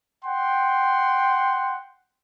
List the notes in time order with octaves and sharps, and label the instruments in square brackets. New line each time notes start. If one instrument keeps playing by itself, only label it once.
[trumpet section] F#5 G5 C6